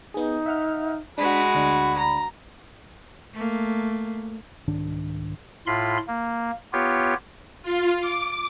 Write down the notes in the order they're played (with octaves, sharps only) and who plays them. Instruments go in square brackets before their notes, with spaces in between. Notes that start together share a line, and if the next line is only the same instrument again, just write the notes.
[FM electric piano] B3 G#4 [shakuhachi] D#4
[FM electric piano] E5 F#5 F6
[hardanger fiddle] G#3 F#4 [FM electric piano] D4 B6 [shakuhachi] B5
[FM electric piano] D2 D4
[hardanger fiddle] A#5
[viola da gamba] A3 A#3
[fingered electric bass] C2 G#2 D#3 D4
[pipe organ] A2 F4 B5 C6
A#3
B3 F4 G4 C#5
[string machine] F4
D6